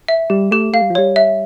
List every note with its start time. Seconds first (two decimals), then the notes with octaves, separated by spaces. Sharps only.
0.08 E5
0.30 G3 G4
0.51 A3 G4
0.73 A3 F5
0.82 G3
0.90 F3
0.95 G3 C#5
1.16 E5